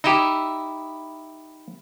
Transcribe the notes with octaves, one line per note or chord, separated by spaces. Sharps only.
D#4 E4 G4 D#5 E5